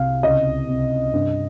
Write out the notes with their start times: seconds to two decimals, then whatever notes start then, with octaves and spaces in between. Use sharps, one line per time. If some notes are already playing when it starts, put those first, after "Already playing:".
Already playing: C2 C3 F5
0.23 C#2 D#5
0.68 C3
1.13 G2